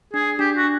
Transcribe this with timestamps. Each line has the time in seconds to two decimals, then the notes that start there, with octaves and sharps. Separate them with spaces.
0.14 D4 G#4
0.39 D4 G4
0.56 F#4
0.64 D4